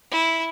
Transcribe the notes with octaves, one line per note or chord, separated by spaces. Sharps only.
E4